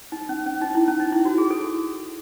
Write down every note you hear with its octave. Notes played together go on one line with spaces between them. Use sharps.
D#4
C#4
C#4
D#4
E4
C#4
D#4
E4
F#4
G#4
A4